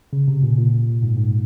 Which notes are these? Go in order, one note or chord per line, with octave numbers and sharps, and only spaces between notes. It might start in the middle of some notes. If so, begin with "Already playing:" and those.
C#3
C3
A#2
A#2
G#2
G#2